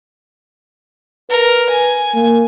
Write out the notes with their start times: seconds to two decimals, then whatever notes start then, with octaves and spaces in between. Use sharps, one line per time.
1.30 A#4 B4
1.70 G#5
2.14 A#3